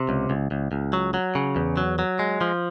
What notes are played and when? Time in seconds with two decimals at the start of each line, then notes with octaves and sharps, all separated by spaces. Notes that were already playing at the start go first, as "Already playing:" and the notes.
Already playing: C3
0.09 C#2
0.30 C#2
0.51 C#2
0.72 C#2
0.93 F#3
1.14 F#3
1.35 C#3
1.56 E2
1.77 F#3
1.99 F#3
2.19 G#3
2.41 F3